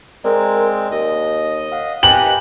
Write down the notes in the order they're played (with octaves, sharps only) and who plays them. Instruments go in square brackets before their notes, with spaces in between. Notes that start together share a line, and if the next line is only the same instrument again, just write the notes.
[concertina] G#3 C4 [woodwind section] A#4 [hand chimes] D5
[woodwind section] D#2 [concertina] D#5
[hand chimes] F5 F#5
[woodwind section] D#3 [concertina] G4 B4 A#5 [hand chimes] G5 G#5 F#6 [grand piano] F#7